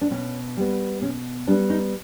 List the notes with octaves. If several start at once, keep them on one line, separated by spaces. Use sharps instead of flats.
D4
B2 C#4
G3 B3
B2 C#4
G3 B3 D4
D#4